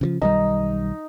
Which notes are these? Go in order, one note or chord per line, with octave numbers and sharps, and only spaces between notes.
C#3 E3 F3
B1 D#3 G3 D#4